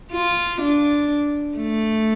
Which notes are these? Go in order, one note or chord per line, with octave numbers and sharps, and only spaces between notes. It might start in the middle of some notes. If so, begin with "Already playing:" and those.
F4
D4
A3